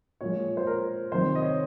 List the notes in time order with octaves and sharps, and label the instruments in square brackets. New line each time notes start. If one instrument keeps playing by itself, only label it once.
[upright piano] A#2 F3 G#3 C#5
C5
A#4
C3 D#3 G3 C5
D#5
C#5